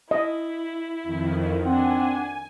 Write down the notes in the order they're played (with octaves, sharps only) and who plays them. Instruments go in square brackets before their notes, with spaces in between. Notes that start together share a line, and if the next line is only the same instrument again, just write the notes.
[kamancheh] E4 [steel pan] D#5
[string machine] F2 D#3
[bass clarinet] C4 [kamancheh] D4 F#5 [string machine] G#5